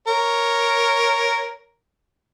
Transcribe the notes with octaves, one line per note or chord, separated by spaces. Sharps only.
A#4 C#5